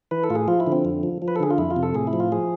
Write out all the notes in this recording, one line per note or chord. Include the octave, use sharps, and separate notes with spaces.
E3 B4
A4
A2 F4
G#4
F3 F4
E4
D3
C4
F2
F3
F3
B4
A4
D3 G#4
F4
F2 E4
F4
C3
A4
A2 G#4
E4
F3
F4
F3 G#4